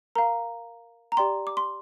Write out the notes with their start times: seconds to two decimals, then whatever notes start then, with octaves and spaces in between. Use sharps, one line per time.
0.15 A#4 F5 A#5
1.12 A#5
1.17 G4 D5 G5 C6
1.47 D6
1.57 C6